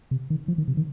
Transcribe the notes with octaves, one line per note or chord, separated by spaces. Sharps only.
C3
D#3
F3
D#3
C3
D#3